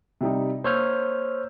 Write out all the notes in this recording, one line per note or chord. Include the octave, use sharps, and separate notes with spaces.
C3 G3 D#4
A#3 C5 C#5 E6 F6 G6